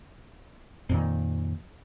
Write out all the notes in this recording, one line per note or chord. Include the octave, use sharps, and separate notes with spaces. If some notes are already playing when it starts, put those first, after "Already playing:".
F2 A#2 D#3